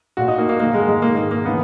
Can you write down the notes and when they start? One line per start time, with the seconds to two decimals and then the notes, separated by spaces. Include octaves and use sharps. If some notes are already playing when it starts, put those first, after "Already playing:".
0.17 A#2 F#4
0.28 D#4
0.38 A#3
0.49 A#3
0.60 G#2 D#3 A#3
0.74 G#3
0.88 G#3
1.02 G#2 D#3 A#3
1.16 A#3
1.31 A#3
1.45 C#3 E3 B3